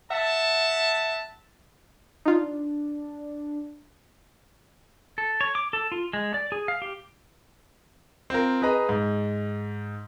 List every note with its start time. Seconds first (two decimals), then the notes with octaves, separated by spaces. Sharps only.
0.10 E5 F#5 A5
2.26 D4 D#4 F4
5.18 A4
5.41 C#5
5.55 D6
5.73 A4
5.92 F4
6.13 G#3
6.34 D5
6.52 G#4
6.68 F5
6.82 G4
8.30 C4 F4 A#4
8.62 G#4 B4 D#5 A#5
8.89 G#2